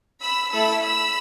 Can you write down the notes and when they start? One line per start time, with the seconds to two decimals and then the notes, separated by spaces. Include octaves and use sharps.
0.21 B5 E6
0.52 A3 E4 A4 B5 E6
0.82 B5 E6